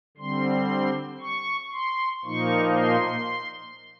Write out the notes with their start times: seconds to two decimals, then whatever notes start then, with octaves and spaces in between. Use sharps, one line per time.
0.17 D3 G3 C4 C6
1.21 C#6
1.73 C6
2.24 A#2 F3 A#3 D#4 C#6
2.76 C6